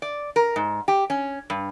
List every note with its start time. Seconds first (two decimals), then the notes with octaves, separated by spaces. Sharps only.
0.02 D5
0.36 A#4
0.56 G#2
0.88 G4
1.10 C#4
1.50 G2